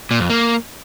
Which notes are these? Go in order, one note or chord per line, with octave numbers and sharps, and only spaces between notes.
A#2
F2
A#3